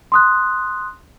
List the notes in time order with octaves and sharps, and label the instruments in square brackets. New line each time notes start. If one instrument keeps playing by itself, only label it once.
[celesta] C6 D#6 F#6